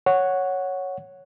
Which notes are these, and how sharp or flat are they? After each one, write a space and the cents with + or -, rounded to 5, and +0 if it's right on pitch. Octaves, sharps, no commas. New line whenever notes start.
C#5 +0 F#5 +0